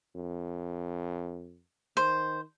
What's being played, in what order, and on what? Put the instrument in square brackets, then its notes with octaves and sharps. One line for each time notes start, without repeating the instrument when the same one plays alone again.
[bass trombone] F2
[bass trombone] D#3 [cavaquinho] C5